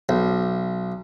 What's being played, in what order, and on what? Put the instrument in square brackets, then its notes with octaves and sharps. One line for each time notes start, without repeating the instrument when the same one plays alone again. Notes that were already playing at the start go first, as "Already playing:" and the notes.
[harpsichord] B1